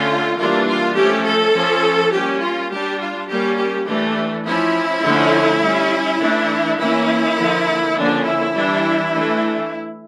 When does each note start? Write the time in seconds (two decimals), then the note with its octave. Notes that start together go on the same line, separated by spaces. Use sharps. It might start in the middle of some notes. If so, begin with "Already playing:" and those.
Already playing: D3 A3 C#4 F4
0.37 E3 G3 A#3 D4 F4
0.67 F4
0.95 F3 A3 C#4 G4
1.24 A4
1.53 F3 C#4
2.12 G3 A#3 C#4 G4
2.41 F4
2.70 G3 D4 G4
3.00 F4
3.29 G3 A#3 C#4 G4
3.58 G4
3.86 E3 A3 D4 G4
4.45 F3 C#4 E4
5.03 D3 F3 A3 C#4
5.62 G3 C#4
6.20 E3 A3 D4
6.79 E3 A#3 C#4 E4
7.37 D3 F3 A#3
7.95 D3 F3 A#3 C#4 D4
8.25 E4
8.53 E3 G3 D4
9.12 E3 A3 D4